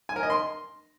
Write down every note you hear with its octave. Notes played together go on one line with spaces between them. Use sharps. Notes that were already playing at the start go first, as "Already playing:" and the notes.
G#5
A#4
D#5
C6